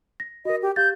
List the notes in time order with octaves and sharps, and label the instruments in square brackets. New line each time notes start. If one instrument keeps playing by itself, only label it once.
[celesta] A#6
[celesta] F#4 A#4 [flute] D#5
[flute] G4
[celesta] G4 F5 A6 [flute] G6